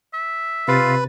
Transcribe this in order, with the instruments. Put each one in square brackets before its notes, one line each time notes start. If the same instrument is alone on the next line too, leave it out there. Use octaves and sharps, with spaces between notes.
[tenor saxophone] E5
[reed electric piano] C3 A6 [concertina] F4 F5 [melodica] B4